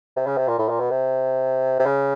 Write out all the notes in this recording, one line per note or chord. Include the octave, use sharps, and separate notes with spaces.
C3
C#3
C3
A#2
A2
A#2
B2
C3
C3
C#3